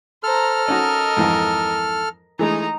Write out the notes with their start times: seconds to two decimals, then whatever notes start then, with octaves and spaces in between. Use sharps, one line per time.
0.23 A4 C5 A#5 F6
0.68 C#4 D#4 F#4 A#4 D#5
1.17 F2 G#2 E3
2.39 E3 G#3 A3 D#4 A#5